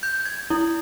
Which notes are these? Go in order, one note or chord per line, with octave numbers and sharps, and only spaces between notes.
G6
G#6
E4